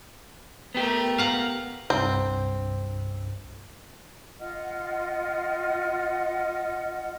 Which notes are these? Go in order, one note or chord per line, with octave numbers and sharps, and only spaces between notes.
A3 B3 G4 A#4
F5 F#5 A#5
C2 G2 C4
F4 D#5 F#5 F6